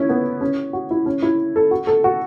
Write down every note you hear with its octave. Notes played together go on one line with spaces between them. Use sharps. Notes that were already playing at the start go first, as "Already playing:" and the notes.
Already playing: C#4 E4
B3
C#4
F#4
E4
C#4
E4
A4
F#4
A4
F#4